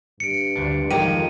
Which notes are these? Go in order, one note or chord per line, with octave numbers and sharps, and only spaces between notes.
G2 C#7 D7
D2 D4
F2 D#3 F3 G#3 G4 A#5 D#7